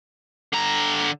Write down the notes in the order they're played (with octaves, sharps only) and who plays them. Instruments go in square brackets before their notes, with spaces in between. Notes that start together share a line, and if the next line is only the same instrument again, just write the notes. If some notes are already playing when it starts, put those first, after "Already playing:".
[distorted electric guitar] D3 A#5